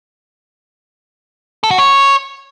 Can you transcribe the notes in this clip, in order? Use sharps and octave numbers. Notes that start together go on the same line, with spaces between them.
A4
F#4
C#5